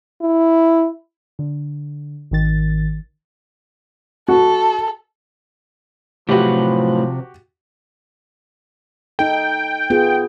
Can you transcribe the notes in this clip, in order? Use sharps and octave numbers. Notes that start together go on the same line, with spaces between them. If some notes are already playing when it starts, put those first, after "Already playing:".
E4
D3
G#1 D#3 A6
F#4 A4
A2 C3 F3 F#3 F#4 G4 B4
D#4 A4 G5
B3 F4 G#4